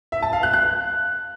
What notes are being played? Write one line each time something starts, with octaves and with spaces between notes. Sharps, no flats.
E5
A5
F5
F#6
F#6